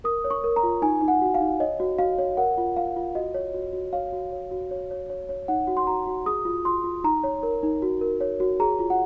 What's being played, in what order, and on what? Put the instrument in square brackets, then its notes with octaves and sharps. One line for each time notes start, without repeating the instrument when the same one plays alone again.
[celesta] A#4 D#6
C#5
C#6
A#4
A#5
F4
D#4 G#5
D#4
F#5
F#4
F5
D#4
C#5 D#5
F#4
F#4 F5
C#5
A#4 F#5
F4
F4 F5
F4
F#4 D#5
C#5
F#4
F#4
C#5 F5
F#4
C#5
F#4
C#5
C#5
C#5
C#5
D#4 F#5
F#4
C6
F#4 A#5
F#4
G#4 D#6
F4
F4 C6
F4
D#4 A#5
C#5
A#4
D#4
F#4
A#4
C#5
F#4
G#4 A#5
F4
F#5